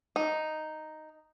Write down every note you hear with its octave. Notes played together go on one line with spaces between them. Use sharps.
D#4